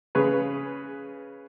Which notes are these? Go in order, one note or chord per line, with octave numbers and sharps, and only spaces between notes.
C#3 G#4 B4 C#5